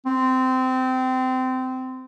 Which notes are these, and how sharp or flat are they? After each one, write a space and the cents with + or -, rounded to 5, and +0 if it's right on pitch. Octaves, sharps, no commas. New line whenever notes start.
C4 -20